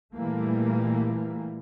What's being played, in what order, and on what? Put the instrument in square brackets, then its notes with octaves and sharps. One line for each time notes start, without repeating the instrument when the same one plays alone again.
[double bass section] A#2 E3 G3 A3 A#3